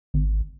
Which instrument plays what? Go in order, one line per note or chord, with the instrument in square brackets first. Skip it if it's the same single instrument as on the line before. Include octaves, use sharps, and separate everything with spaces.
[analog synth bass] G#1